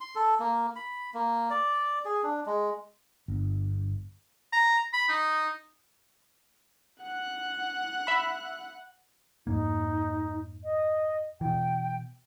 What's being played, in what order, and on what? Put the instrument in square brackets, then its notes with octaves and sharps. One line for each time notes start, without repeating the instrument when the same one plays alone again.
[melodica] C6
A4
A#3
B5
A#3
D5
G#4
D4
G#3
[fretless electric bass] G1
[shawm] A#5
B5
D#4
[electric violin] F#5 F#6
[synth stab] E5 B5
[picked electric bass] F2 G#2 A#3 [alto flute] D#4
[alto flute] D#5
[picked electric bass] B2 E3 [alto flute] G5